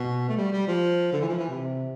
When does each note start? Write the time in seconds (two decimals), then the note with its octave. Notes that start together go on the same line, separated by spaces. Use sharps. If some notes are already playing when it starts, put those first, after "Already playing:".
Already playing: B2
0.29 A3
0.37 G3
0.52 G3
0.68 F3
1.13 D3
1.21 E3
1.29 F3
1.39 E3
1.49 C3